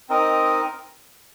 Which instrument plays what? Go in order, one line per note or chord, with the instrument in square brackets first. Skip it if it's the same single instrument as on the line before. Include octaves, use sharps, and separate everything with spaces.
[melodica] C4 D#4 A#4 D#5